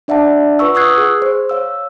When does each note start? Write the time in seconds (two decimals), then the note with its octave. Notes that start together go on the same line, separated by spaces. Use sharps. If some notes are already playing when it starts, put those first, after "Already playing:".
0.08 D4 D5 E5 F#5 A5
0.59 F4 B4 F#5 C#6 E6
0.75 C#6 D#6 E6 F#6 G#6 C7
0.98 G#4
1.22 C5
1.49 C#5 F5 E6